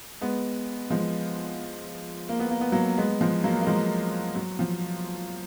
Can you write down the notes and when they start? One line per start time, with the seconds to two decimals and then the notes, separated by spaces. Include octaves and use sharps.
0.21 G#3 B3
0.90 F3 G#3
2.29 A#3
2.40 B3
2.50 A#3
2.61 B3
2.72 F#3 A#3
2.98 G#3 B3
3.21 F3 G#3
3.44 F#3 A#3
3.61 A#3
3.67 F3 G#3
4.36 F#3
4.59 F3